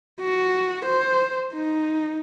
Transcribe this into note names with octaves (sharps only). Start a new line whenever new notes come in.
F#4
C5
D#4